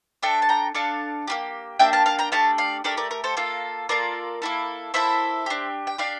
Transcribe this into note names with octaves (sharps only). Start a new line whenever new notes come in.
D4 A4 E5 G5
A5
G5 A#5
D4 A4 F5 A5
A#3 D4 G4
A#3 D4 G4 E5 G5
F5 A5
F5 A5
G5 A#5
A3 D4 G4 F5 A5
D5 F5
A3 D4 G4 A#4 D5
A#4 D5
A#4
A4 C5
A#3 F4 A4
A#3 F4 A4 A#4 D5
A#3 E4 A4
A#3 E4 A4 C5 E5
D4 G4
G5
D4 G4 D5 F5